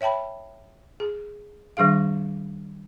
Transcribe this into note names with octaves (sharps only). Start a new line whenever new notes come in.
C#5 E5 G5 A5 B5
G#4
D#3 G3 D4 G#4 F5